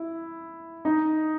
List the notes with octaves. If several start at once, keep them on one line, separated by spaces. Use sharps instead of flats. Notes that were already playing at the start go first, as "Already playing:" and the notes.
Already playing: E4
D#4